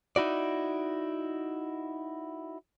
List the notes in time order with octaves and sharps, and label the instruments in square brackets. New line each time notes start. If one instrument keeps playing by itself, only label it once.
[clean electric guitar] D#4 E4 F#4 D5